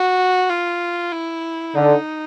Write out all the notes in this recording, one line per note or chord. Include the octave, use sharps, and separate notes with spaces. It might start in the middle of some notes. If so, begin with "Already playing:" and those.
Already playing: F#4
F4
E4
D3 D#4